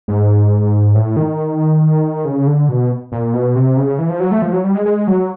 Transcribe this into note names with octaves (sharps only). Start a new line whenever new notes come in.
G#2
A2
D#3
C#3
D3
B2
A#2
B2
C3
C#3
E3
F3
F#3
A3
F3
F#3
G3
G#3
G#3
F#3